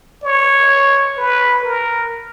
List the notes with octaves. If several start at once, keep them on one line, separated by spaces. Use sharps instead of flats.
C#5
B4
A#4